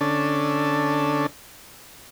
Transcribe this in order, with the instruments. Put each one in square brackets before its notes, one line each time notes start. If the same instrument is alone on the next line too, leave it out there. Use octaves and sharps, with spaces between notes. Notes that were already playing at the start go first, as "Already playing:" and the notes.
[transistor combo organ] D3 C#4 D4 A4